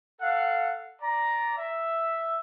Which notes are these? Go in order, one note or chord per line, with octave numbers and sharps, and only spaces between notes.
A4 F5 F#5
D5 A#5
E5